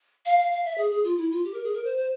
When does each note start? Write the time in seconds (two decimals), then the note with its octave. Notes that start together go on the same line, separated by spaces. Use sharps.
0.26 F5
0.39 F5
0.52 F5
0.65 E5
0.78 G#4
0.91 G#4
1.04 F4
1.17 E4
1.31 F4
1.45 G4
1.54 A#4
1.64 G#4
1.74 A#4
1.84 C5
1.97 C5